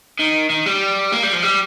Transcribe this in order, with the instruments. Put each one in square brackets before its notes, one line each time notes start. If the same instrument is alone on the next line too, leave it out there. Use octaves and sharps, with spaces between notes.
[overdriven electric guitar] D#3
D#3
G3
A#3
G3
F3
G3